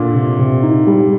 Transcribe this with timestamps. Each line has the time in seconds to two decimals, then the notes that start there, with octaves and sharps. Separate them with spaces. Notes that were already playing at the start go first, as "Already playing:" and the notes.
Already playing: A#2 D3
0.14 C3
0.39 C3
0.63 D#4
0.87 G3